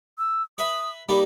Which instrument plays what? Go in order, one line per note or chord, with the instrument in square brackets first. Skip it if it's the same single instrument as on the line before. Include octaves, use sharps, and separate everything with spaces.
[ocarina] E6
[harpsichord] B4 E5 B5 [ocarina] D#6
[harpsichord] G3 A#3 D#4 [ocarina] B5